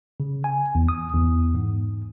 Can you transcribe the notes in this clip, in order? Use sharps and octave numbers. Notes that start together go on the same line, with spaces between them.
C#3
G#5
E2
D#6
E2
G#2